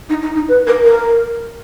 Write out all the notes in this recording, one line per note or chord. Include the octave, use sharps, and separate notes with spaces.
D#4
D#4
D#4
B4
A#4
A#4